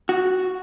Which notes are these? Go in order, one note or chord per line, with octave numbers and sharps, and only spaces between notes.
F#4